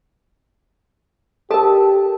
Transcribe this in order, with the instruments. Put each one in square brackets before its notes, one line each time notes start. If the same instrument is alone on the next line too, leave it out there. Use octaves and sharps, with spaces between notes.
[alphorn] G4 [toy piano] A4 A#4 [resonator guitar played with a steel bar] A5